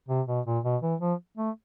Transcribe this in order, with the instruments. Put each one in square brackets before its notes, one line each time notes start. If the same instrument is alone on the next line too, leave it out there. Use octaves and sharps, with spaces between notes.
[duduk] C3
B2
A#2
B2
E3
F3
A3